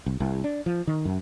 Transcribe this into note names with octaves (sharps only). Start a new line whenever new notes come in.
C2
C2
D4
F3
D#3
F#2